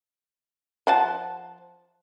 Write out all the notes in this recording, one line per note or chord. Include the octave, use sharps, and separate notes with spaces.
F3 F#5 A5